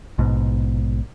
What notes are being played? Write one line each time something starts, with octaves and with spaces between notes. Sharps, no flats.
A#1 G#2 B2